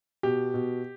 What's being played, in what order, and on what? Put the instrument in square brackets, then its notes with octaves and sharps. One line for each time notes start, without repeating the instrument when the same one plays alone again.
[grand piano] B2 G4
B2